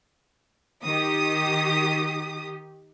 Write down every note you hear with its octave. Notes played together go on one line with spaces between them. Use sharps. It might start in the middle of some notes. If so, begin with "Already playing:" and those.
D#3 G4 D#6